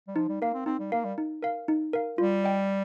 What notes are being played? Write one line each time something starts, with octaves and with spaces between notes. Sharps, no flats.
G3
F3 D#4
G3
A#3 A#4 F5
C4
C4 D#4
G3
A#3 A#4 F5
G3
D#4
A#4 F5
D#4
A#4 F5
G3 F4
D#5 G5